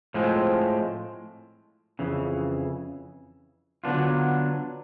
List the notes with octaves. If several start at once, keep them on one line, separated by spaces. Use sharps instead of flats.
A2 F3 G#3 C4
F2 C#3 E3
D3 F#3 B3 D4 F4